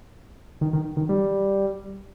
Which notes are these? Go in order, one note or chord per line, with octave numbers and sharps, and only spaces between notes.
D#3
D#3
D#3
G3